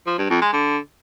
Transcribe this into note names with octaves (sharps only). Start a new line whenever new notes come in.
F3
G2
F2
G#3
D3